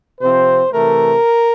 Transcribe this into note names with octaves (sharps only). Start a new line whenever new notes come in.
C3 F3 C4 C5
C3 E3 A3 A#4